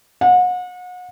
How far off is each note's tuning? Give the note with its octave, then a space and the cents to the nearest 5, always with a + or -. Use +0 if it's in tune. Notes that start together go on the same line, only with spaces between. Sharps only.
F#5 -35